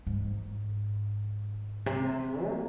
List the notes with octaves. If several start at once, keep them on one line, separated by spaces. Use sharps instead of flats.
G#2
C3
A#3